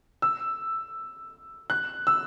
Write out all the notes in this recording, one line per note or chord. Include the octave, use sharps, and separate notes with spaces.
E6
F#6
E6